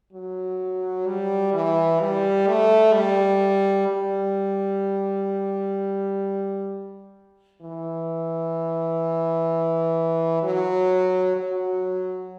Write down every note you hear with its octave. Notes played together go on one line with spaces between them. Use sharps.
F#3
G3
E3
G3
A3
G3
G3
E3
F#3
F#3